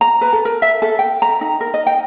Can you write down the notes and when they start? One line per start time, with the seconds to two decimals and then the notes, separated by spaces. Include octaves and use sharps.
0.01 A#5
0.21 B4
0.33 A4
0.45 A#4
0.62 E5
0.82 A4
0.99 G5
1.22 A#5
1.41 D#4
1.61 A#4
1.74 D#5
1.87 G5